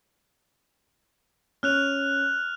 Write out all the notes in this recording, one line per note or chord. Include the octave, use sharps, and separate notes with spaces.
C#4 F6 F#6 F7